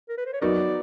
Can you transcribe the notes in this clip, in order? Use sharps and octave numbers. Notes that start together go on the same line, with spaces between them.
A#4
B4
C5
C#5
F#3 B3 D#4 F#4 A#4 D5